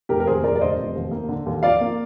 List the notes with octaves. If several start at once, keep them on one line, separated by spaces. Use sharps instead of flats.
F1 G4 A#4
A#4
D#2 G#4 C5
F1 A#4 D5
D5
D3 C5 D#5
F1
D#2
A#3
D3
D#2
F3 D5 F5
A#3